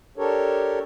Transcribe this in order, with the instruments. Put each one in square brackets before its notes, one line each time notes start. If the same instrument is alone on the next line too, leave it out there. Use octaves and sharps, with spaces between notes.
[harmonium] D4 G4 A4 A#4 C#5